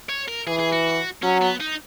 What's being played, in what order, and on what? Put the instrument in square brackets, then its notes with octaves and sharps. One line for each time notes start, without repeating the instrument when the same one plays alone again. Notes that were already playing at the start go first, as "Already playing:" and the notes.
[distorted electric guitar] C#5
A#4
[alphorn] E3 [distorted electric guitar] G#4
[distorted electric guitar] G#4
F#4
[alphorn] F#3 [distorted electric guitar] C#4
[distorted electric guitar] B3
D#4